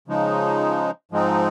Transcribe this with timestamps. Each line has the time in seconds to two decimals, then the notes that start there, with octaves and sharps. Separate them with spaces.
0.08 C#3 F3 G#3 D#4
1.11 G#2 F3 G#3 C4 D#4